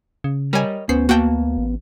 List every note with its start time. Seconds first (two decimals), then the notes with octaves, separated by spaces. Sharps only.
0.24 C#3
0.53 G3 A#4 C#5 D#5 G#5
0.89 D2 B3 C#4 C5 C7
1.09 A#3 F#4 G5 A5
1.58 A1